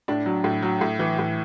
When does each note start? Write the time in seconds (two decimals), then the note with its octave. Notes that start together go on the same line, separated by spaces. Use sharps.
0.08 A2 D4
0.26 F#3
0.44 A2
0.62 F#3
0.81 A2
0.99 E3
1.19 A2